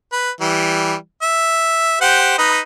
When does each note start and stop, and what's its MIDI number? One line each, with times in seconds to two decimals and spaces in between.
0.13 0.30 71
0.41 0.94 52
0.41 0.94 55
1.22 1.99 76
2.01 2.36 67
2.01 2.36 72
2.01 2.36 78
2.38 2.59 63
2.38 2.59 71
2.38 2.59 75